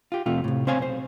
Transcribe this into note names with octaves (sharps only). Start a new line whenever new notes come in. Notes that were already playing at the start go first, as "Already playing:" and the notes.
F4 G4
F2 C3 A3 F4
A2 C3
C4 C5 C#5 F5 G#5
B1 C5